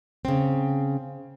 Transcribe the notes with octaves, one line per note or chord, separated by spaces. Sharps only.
C#3 C4